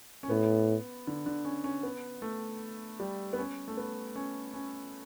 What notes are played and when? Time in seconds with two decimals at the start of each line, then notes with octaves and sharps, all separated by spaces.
0.23 C#4
0.29 A2 B3
1.07 D3
1.26 D3
1.45 C#4
1.64 C#4
1.83 B3
2.22 A3
3.00 G3
3.33 B3
3.38 C#4
3.68 A3
3.77 B3
4.16 C#4
4.54 C#4